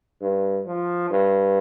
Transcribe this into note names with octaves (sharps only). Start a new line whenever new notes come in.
G2
F3
G2